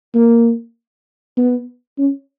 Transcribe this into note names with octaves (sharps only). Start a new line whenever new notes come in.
A#3
B3
C#4